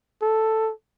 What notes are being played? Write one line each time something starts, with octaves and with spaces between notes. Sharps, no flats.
A4